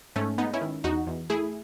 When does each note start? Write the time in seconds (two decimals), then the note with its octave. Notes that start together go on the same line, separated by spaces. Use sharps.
0.16 G#2 A3 C#4
0.38 G#3 B3 D#4
0.53 C#4 E4
0.61 D#3
0.84 E2 D#4 F#4
1.07 E2
1.30 A3 E4 G#4